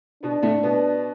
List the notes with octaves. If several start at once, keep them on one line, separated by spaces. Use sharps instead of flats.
B2 B3 D4
A2 A3
B2 B3